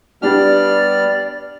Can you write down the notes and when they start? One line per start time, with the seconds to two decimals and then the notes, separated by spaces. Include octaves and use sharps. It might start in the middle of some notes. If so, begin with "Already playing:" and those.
0.22 G3 B3 D4 G4 D5 F6